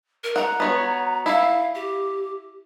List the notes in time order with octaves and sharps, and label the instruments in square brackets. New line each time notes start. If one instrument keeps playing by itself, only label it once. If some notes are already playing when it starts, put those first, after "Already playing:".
[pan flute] A#4
[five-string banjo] F#5 [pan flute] A#5
[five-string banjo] B3 F#4 C#5
[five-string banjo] E4 [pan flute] F5
[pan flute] G4